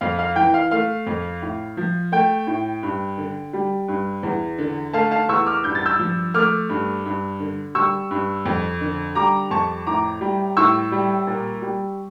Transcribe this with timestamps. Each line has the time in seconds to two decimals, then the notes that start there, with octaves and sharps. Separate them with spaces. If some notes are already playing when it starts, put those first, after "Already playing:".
0.01 F2 F5
0.19 F5
0.36 E3 G5
0.54 F5
0.71 A3 F5
1.07 F2
1.42 A2
1.77 F3
2.12 A3 G5
2.47 A2
2.83 G2
3.17 D3
3.53 G3
3.88 G2
4.23 E2
4.58 D3
4.93 A3 F5 A5
5.11 F5 A5
5.29 E2 C#6 E6
5.46 D6 F6
5.64 G2 G6
5.75 A6
5.85 E6 G6
5.99 F3
6.34 A3 D6 F6
6.69 G2
7.05 G2
7.40 D3
7.75 G3 C#6 E6
8.11 G2
8.46 F2
8.81 D3
9.15 G3 A#5 D6
9.51 F2 A5 C#6
9.86 A2 A#5 D6
10.21 G3
10.57 A2 C#6 E6
10.92 G3
11.27 A#2
11.62 G3